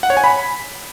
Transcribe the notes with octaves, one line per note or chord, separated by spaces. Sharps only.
F#5
C#5
G#5
B5